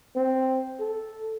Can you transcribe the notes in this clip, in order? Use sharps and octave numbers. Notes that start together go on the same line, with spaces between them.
C4
A4